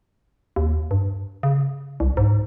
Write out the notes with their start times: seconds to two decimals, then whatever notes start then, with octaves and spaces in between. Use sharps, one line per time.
0.56 D#2
0.91 G2
1.43 C#3
2.00 C2
2.17 G#2